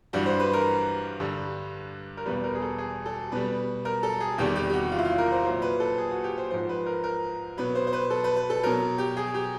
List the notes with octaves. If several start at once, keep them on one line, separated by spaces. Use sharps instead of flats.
G2 E3 G3 F#4
C5
B4
A#4
G2 D3 G3
A#4
E2 B2 G3 B4
A#4
G#4
A4
G#4
A4
B2 G3 B4
A#4
A4
G#4
E2 C3 D#3 G3 G4
G4
G4
F#4
F4
E4
F4
A#4
C5
A#2 F#3 C5
B4
A4
G#4
F#4
G4
C5
G#2 F3 C5
B4
A#4
A#4
B2 F#3 B4
C5
C5
B4
A4
B4
B4
A4
B2 F#3 A#4
G4
G#4
G4